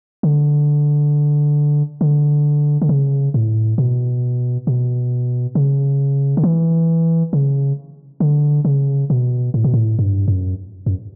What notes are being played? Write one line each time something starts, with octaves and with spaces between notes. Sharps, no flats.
D3
D3
D3
C#3
A2
B2
B2
C#3
D3
E3
C#3
D3
C#3
B2
A2
B2
A2
G2
F#2
F#2